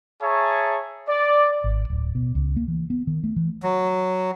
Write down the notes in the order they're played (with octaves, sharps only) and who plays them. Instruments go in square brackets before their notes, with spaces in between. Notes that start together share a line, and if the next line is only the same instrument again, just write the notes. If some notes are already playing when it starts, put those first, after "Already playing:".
[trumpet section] G#4 C#5 E5 A5 A#5 C#6
D5
[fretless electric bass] G#1
D1
B2
C#2
A#3
E3
B3
D#3
A3
E3
[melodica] F#3